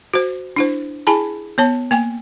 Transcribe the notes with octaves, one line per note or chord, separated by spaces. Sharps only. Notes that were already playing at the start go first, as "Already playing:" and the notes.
F#4 C5
D4 E4 C5
E4 G#4 G#5 A5 B5
B3 C#5 A5
A#3 G5 G#5